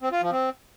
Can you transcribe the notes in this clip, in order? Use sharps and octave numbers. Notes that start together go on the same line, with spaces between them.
C4
F4
F3
C4